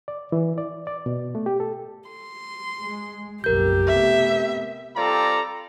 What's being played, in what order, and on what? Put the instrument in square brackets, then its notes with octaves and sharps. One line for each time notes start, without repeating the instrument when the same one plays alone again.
[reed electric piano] D5
E3
D5
D5
B2
A3
G4
A4
[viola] C6
[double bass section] G#3
[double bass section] F#1 B1 F2 [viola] G4 [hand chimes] A#4 G6
[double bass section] C3 A3 B3 [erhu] E5
[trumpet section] G3 C4 F4 A4 D5 A#5